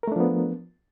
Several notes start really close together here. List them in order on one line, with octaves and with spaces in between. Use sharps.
A#4 A3 D4 F3 B3